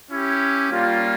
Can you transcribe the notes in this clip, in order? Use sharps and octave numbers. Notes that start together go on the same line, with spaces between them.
C#4 E4 G4
G3 A#3 C#4 F4